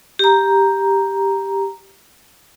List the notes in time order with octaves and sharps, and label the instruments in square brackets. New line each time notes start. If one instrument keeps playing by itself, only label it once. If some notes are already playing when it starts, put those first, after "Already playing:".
[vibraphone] G4 A#5